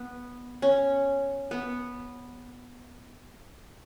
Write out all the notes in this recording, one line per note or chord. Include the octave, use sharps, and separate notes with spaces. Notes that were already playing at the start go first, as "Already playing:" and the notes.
Already playing: B3
C#4
B3